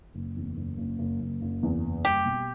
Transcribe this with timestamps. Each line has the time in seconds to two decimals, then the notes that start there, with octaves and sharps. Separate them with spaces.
0.14 F#1
0.36 E2
0.57 F#1
0.78 F#1
0.99 F#1
1.20 F#1
1.41 F#1
1.63 E2
1.84 F#1
2.05 G3 G4
2.25 B2